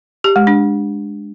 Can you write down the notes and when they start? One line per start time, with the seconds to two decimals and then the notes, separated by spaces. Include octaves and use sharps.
0.24 G4
0.36 G#3
0.47 D4